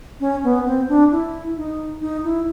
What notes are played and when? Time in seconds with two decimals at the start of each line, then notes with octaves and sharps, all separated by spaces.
0.20 C#4
0.44 B3
0.66 C4
0.88 D4
1.11 E4
1.57 D#4
2.01 D#4
2.24 E4